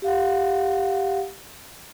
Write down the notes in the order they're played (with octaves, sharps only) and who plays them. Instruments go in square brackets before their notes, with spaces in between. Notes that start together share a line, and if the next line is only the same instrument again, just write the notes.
[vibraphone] G4 F5 F#5